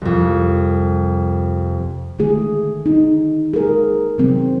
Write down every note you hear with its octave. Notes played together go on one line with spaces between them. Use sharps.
C2 F2
D3 D#3 A3 G#4
D#4
G#4 A#4
C3 D#3 F#3 C4